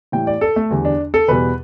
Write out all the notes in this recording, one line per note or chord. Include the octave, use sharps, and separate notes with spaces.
A2 E3 G3 G5
D5
A4
A3
E2 D3 G3
D4
A4
E2 B2 G3 B4